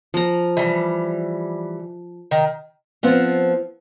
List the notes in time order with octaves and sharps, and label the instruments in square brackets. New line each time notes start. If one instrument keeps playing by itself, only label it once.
[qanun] F3 A#5
[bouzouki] E3 G3
D#3
[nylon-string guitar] F3 B3 C4 F4